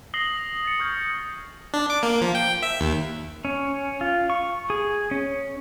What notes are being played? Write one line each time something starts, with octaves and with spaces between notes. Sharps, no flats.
D#6 A#6 C7 F#7 G7
A6 C#7
C#6 F6 G6 G#6
D4
D6
A#3
F3
G5
E5
D#2
C#4
F4
C#6
G#4
C#4